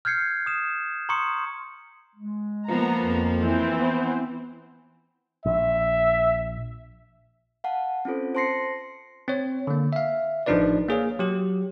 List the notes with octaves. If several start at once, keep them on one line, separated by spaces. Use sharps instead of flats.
F6 G6 G#6 C7 C#7
D#6 E7
A#5 C6 C#6 D#6 C#7
G#3
F3 A#3 B3 A#5
F2
E3 C4 C5
B3
A#1 E5
F5 F#5 A5
C4 C#4 F4 A4 C5
C5 A5 C6 A#6 C7 C#7
C4 C#5
D3 A#3
E5 F5
A1 F3 D4 D#4 B4 D5
A#3 G#4 C#5 F5
F#3 G4